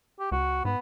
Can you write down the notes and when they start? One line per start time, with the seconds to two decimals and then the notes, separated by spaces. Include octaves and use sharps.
0.19 G4
0.32 C#2 F#4
0.65 G#2 B3